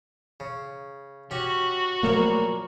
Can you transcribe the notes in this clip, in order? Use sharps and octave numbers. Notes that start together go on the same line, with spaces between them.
C#3
C#4 F#4 G4
A#1 A#2 F#3 A3 A#3 A#4